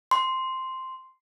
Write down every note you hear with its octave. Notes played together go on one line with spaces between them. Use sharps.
C6